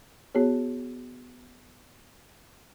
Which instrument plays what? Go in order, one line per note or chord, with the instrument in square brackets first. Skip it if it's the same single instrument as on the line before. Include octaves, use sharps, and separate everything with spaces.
[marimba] B3 F#4 G#4 C#5